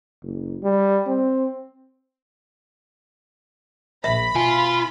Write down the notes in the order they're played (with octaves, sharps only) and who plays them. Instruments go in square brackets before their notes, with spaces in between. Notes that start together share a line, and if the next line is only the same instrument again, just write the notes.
[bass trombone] F#1
G3
C4
[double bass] A#1 [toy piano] E5 [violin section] B5
[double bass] B2 [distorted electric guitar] F4 [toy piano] G#5